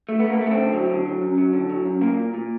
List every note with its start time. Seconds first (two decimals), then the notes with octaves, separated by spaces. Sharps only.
0.09 A3
0.19 B3
0.24 A3
0.30 A#3
0.41 A3
0.46 B3
0.51 C4
0.57 D3
0.73 F#3
0.89 D3
1.05 F#3
1.21 F#2
1.37 F#3
1.53 D3
1.70 F#3
1.85 F#2
2.01 A#2 A#3
2.18 A#2
2.34 A#2